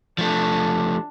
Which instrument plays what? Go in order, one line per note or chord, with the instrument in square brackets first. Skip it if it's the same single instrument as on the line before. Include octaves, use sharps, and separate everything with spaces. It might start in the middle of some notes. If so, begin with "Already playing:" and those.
[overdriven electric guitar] F3 A3 [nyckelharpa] D4